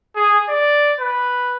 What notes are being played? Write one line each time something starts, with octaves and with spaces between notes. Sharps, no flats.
G#4
D5
B4